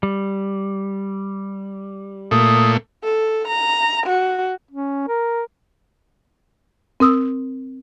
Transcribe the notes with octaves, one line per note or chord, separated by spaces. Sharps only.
G3
A#2 A3 D#6
A4
A#5
F#4
C#4
A#4
C4 A#4 D#6 E6